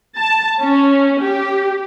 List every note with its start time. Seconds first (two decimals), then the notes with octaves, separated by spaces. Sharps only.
0.18 A5
0.60 C#4
1.22 G4